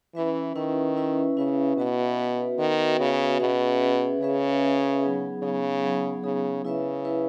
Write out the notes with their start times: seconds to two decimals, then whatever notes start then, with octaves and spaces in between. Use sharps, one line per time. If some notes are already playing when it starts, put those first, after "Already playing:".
0.15 E3 C#4 E4 B4 E5
0.55 D#3 C#4 E4 B4 E5
0.97 C#4 E4 B4 E5
1.37 C#3 C#4 E4 B4 E5
1.77 B2 B3 F#4 B4 E5
2.18 B3 F#4 B4 E5
2.58 D#3 B3 F#4 B4 E5
3.00 C#3 B3 F#4 B4 E5
3.40 B2 C#4 G#4 B4 E5
3.80 C#4 G#4 B4 E5
4.21 C#3 C#4 G#4 B4 E5
4.61 C#4 G#4 B4 E5
5.01 F#3 B3 D#4 G#4
5.42 C#3 F#3 B3 D#4 G#4
5.83 F#3 B3 D#4 G#4
6.24 C#3 F#3 B3 D#4 G#4
6.65 C#3 E4 B4 E5
7.05 E4 B4 E5